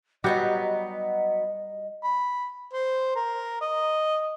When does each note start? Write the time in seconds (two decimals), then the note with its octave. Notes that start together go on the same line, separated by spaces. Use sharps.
0.24 F#3 G3 B3 D#4 F#4 G4 D#5
2.04 B5
2.73 C5
3.15 A#4
3.61 D#5